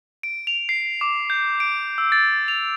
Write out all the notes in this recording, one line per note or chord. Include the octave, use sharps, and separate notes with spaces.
D7
F7
C7
D6
G6
D7
E6
A6
F7